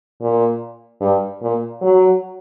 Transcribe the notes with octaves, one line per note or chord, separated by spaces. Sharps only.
A#2
G2
A#2
F#3